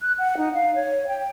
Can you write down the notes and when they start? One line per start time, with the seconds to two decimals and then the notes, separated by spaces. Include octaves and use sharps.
0.01 F#6
0.18 F#5
0.37 D#4
0.54 F5
0.75 C#5
1.08 G5